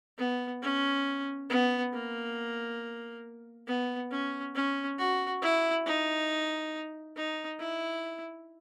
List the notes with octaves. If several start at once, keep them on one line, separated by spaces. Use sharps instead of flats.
B3
C#4
B3
A#3
B3
C#4
C#4
F#4
E4
D#4
D#4
E4